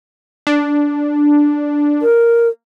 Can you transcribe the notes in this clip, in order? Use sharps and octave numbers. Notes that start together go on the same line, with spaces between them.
D4
A#4